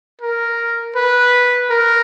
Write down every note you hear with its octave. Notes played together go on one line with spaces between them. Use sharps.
A#4
B4
A#4